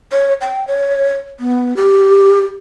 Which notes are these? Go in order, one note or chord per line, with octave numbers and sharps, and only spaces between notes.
C#5
G5
C#5
B3
G4